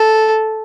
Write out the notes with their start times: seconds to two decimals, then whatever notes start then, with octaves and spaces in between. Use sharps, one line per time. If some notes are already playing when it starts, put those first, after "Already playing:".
Already playing: A4